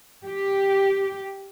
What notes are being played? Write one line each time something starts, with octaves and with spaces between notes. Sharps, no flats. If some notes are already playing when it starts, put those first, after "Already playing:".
G4